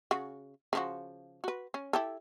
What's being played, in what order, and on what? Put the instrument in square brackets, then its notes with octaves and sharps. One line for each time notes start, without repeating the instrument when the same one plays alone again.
[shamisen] C#3 F#4
C#3 F3 F#4
F#4 B4
C#4
E4 G4 A4